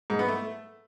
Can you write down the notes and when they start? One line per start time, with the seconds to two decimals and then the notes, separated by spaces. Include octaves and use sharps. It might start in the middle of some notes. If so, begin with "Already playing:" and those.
0.10 G#2
0.19 B3
0.28 A3